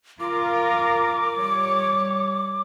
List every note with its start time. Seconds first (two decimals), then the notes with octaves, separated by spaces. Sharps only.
0.20 F4 A#4 D6
1.36 G3 C#5